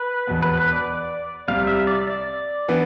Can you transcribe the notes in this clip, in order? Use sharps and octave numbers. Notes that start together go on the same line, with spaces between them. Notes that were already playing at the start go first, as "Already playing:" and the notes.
Already playing: B4
E1 E2 B2 B3
B4
B4
D5
C2 C3 G3 F5
E5
D5
D5
E3 B3 D4